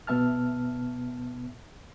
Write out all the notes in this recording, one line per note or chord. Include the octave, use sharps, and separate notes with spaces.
B2 B3 E5 A5 F6